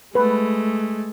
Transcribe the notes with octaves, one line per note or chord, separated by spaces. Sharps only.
G#3 A3 B4